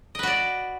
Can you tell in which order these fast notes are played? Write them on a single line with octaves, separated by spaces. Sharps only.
D#5 B4 F#4 D5